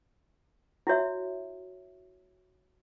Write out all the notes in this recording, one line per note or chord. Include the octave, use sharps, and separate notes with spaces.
E4 F#4 C#5 E5